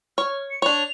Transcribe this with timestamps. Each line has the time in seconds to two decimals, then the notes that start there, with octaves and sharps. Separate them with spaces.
0.18 C#5 F6
0.51 C#7
0.62 D4 C#5 F7